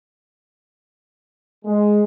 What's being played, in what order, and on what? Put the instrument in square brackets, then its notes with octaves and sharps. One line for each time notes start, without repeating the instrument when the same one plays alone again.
[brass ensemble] G#3